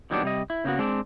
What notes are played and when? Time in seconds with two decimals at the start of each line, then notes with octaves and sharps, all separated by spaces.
0.10 A#2 D#3 F#3 G3 B3 D4
0.23 C3 G3 D#5
0.50 E4
0.64 C#3 A#3 B3 F#4
0.78 G#3 C4 D4